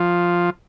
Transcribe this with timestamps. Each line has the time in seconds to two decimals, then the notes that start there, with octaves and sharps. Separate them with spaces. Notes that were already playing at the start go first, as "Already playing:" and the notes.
Already playing: F3